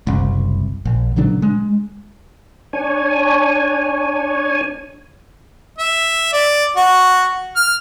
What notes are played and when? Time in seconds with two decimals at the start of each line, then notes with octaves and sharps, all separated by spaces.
0.07 F#1 C2
0.85 A#1
1.16 A#2 C#3 F#3 D4
1.42 G#3
2.73 D4 C#5 G#5
5.79 E5
6.33 D5
6.77 F#4
7.56 F6